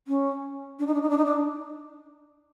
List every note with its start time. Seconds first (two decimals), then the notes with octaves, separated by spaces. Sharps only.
0.08 C#4
0.79 D4
0.87 D#4
0.94 D4
1.02 D#4
1.10 D4
1.18 D#4
1.25 D4